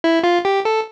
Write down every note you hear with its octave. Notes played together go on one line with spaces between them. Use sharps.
E4
F4
G4
A4